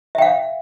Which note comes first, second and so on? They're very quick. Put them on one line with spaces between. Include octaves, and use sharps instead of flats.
E5 G5 F5